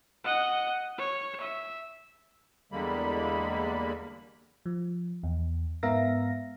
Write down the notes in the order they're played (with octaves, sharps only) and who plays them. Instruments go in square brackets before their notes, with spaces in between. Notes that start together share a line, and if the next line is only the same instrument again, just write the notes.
[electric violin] D#5 F#5
C#5
E5
[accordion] E2 D3 G3 G#3 A#3 B5
[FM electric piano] F3
E2
G#2 B3 A#4 E5 F5 A#6